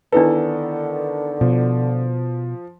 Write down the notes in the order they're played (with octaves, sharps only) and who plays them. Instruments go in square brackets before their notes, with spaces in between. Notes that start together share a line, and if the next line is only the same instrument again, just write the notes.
[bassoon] D3 [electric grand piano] D#3 B3 A4 [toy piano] D4 E4 B4
[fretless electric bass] B2 [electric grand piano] F3